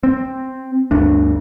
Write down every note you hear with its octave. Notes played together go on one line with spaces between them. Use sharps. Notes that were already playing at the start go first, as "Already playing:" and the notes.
C4
G1 D2 D4